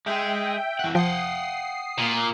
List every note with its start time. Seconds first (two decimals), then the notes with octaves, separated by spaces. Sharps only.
0.06 G#3 G#4 E5 G5
0.79 E3 F#5
0.95 F3 F#5 G5 D#6 C7
1.98 A#2